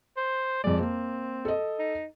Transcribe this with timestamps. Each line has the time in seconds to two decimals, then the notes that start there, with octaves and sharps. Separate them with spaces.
0.17 C5
0.64 F2 G#3 D5
0.80 A#3 C4
1.45 A4 D#5
1.79 D#4